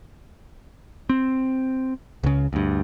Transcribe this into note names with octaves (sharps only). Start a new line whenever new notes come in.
C4
C#2 C#3
D2 G2